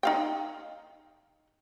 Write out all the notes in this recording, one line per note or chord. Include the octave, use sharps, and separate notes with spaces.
D#4 F5 G5